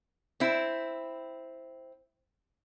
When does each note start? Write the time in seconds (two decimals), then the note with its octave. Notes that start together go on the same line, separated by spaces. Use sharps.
0.40 C4 E4